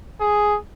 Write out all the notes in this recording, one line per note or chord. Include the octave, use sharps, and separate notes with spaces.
G#4